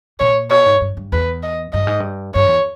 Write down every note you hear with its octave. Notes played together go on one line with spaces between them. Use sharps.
A#2 C#5
B2 C#5
G#2
G2
G2
E2 B4
D#5
G2 D#5
G#2
G2
G2 C#5
E2